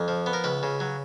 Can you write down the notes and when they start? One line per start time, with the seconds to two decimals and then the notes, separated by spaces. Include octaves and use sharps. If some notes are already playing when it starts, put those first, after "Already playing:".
Already playing: F2
0.08 F3
0.26 B3
0.33 A#4
0.44 C#2 B4
0.63 C#3
0.80 F#3